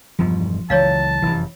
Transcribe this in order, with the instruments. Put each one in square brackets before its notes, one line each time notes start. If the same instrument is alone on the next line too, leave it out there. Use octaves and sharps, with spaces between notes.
[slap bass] E1 G2 B2 [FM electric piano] F3
[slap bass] C#2 E3 F#3 [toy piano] C#5 D5 F5 [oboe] A5
[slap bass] F1 F#2 [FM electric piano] E3